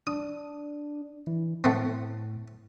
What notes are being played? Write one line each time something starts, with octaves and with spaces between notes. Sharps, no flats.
D4 D#6
E3
A2 A3 B3 C4